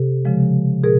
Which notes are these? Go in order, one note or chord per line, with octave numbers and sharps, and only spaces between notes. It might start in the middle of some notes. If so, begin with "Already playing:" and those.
Already playing: C3 G4 A4
C#3 F3 G#3
B2 G#4 A#4